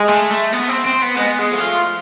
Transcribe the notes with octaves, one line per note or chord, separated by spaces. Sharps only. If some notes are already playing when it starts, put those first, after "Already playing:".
Already playing: G#3
A3
A3
B3
C4
C4
B3
G#3 B3
G#3
F3 A3
F4